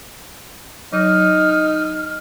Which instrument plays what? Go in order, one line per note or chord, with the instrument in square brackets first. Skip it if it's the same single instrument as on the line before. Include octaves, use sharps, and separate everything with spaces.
[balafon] F#3 [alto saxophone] D#4 [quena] F6